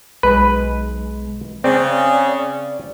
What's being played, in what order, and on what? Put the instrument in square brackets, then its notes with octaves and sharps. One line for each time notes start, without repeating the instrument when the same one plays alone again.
[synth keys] B1 G#3 [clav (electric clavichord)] B4
[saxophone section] C#3 [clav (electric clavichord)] C4 [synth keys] D5